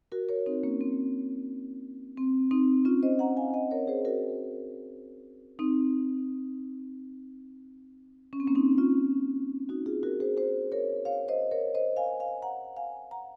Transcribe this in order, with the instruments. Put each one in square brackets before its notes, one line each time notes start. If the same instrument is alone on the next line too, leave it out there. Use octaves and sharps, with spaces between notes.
[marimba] F#4 A#4
A#4 C#5
C4 D#4
A#3 C#4
C4
C4
C4 D#4
C#4 F4
C5 D#5
F#5 A#5
F5 G#5
D#5 F#5
A#4 C#5
G#4 C5
F#4 A#4
C4 D#4
C#4
C4
A#3 C#4
C4 D#4
C#4 F4
D#4 F#4
F4 G#4
F#4 A#4
G#4 C5
G#4 C5
A#4 C#5
C#5 F5
C5 D#5
A#4 C#5
C5 D#5
F5 G#5
F5 G#5
F#5 A#5
F5 G#5
F#5 A#5